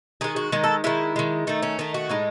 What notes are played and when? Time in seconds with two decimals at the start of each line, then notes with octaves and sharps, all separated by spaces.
0.21 D#3 G#3 G#4
0.36 F#4
0.52 D#3 G#3 D#4
0.64 A4
0.84 D#3 G#3 E4
1.16 D#3 G#3
1.47 D#3 A3 D#4
1.62 C#4
1.79 D#3 A3 D#4
1.94 F#4
2.09 A2 G#3 D#4